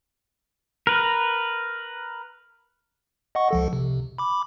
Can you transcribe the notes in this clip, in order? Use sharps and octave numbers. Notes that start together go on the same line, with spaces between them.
A#4 B4
D#5 F#5 C#6
C#2 F3 A4
C3
B5 D6